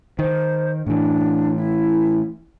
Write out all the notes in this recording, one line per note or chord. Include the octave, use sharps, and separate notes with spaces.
D#3 C5
A2 E3 D4
E4